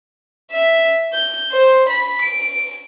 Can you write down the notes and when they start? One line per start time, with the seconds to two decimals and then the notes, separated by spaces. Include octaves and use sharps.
0.51 E5
1.13 G6
1.52 C5
1.89 B5
2.22 D7